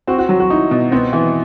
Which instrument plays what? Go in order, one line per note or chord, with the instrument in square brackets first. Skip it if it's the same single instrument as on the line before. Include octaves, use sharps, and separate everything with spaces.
[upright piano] C4 [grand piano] F#4
[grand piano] F#4
[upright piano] F#3
[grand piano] F#4
[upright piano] D#4 [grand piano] E4
[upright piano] B2
[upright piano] B3 [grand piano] C4
[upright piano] E3